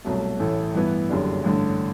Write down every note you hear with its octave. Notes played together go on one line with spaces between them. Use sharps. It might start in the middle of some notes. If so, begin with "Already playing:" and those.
C2 B2 F#3 A3
A1 A2 E3 A3
G2 E3 B3 E4
F#1 F#2 D3 G3
A1 G2 D3